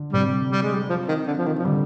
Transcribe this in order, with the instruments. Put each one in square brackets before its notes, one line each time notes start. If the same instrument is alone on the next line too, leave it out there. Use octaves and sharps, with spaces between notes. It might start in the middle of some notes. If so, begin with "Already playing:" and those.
Already playing: [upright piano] D3
[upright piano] C3 [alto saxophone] G3
[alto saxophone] G3
G#3
G3
F3
D#3
D3
F3
D#3
F3
[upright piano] D3 [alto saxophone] G3